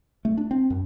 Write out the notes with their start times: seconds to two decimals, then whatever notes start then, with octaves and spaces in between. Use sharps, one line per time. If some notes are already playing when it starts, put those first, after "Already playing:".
0.25 A3
0.37 D4
0.51 C4
0.70 F#2